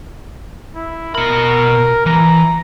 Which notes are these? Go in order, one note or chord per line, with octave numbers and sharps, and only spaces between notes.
E4
B2 A#4 B5
E3 A#5